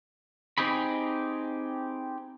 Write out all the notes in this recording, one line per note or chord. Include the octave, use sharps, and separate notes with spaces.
C4 D#4 G4 G#4 B5